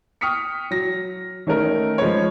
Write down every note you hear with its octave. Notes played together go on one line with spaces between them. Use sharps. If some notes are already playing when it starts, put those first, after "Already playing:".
G5 C#6 D#6 F6 B6 C#7
F#3 A#6
D#3 A3 C#4 D#4 A#4
F3 G#3 C#4 B4 C#5